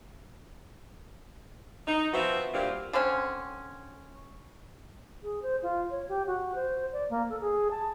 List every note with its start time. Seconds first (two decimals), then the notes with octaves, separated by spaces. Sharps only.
1.87 D#4
2.13 F3 B3 C4 F#4 E5
2.54 G2 A#2 C4 F4 G4
2.93 D3 C4 C#4
5.23 G#4
5.42 C5
5.63 F4
5.91 C#5
6.09 G4
6.27 F#4
6.55 C5
6.92 D5
7.10 A#3
7.30 A4
7.41 G#4
7.71 A5